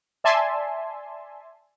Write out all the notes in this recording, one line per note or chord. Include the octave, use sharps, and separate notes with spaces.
D5 E5 G#5 A5 C6